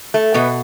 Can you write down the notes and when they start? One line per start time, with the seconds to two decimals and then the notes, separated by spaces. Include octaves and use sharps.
0.14 A3
0.34 B2 B3